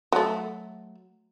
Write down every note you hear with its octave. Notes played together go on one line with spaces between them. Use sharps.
F#3 A3